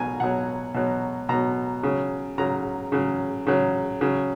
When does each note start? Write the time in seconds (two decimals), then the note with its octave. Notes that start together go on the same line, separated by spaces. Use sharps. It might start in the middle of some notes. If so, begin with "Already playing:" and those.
Already playing: B2 F#3 G#5 A#5
0.20 B2 F#3 F#5
0.74 B2 F#3
1.29 B2 F#3 A#5
1.83 C#3 F#3
2.38 C#3 F#3 A#5
2.92 C#3 F#3
3.47 C#3 F#3
4.01 C#3 F#3